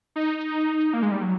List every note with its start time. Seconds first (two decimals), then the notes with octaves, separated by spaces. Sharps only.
0.16 D#4
0.94 A#3
1.03 G#3
1.12 G3
1.22 F#3